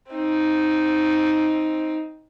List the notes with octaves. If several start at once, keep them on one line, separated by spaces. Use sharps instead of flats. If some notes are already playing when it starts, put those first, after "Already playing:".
C4 D#4